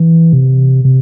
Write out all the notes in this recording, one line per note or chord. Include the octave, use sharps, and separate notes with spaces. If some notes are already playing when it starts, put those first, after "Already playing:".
Already playing: E3
C3
C3